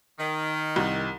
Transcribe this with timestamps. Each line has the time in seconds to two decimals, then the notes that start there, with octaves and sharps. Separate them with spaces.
0.19 D#3
0.76 C2